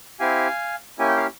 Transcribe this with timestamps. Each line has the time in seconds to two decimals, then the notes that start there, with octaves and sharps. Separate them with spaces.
0.20 C4 E4 G4 F5 G#5
0.99 A#3 C#4 E4 G4 G#5
1.08 G5
1.17 F5